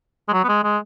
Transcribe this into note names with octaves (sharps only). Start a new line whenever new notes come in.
G#3
F#3
B3
G#3
G#3